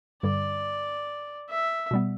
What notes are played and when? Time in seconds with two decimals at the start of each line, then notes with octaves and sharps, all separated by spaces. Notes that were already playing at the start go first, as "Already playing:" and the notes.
0.23 G2 D3 G3 D5
1.50 E5
1.91 B2 G3 B3